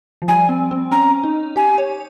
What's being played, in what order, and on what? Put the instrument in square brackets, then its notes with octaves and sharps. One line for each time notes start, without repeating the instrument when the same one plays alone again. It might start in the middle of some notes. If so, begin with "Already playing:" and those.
[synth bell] F3
[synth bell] G3 [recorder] G#5
[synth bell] C4
C4
[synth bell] C#4 [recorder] A#5
[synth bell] D#4
[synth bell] G4 [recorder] G#5
[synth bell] C#5